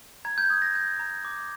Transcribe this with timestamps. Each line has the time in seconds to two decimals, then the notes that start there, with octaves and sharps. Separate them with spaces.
0.25 A#5 G#6
0.38 G6
0.50 D#6 G#6
0.62 A#6
0.75 G6
0.99 A#5
1.25 D6